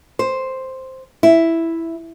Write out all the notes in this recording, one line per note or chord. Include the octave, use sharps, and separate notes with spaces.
C5
E4